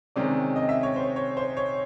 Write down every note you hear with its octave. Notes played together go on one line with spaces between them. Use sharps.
C3 D#3 G#3 C#4 D5
D#5
E5
C#5
C5
C#5
C5
C#5